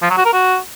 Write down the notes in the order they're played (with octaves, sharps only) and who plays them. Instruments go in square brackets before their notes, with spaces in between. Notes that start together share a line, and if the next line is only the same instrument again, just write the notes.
[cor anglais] F3
F#3
F#4
A#4
F#4